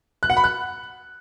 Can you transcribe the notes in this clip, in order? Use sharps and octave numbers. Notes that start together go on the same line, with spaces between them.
F#6
F#5
B5
F#6